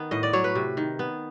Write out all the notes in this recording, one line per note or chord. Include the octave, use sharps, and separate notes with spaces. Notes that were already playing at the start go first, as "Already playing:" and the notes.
Already playing: D#3 B3
A2 D#5
D5
F#3 C#5
B4
C3
D#3
B3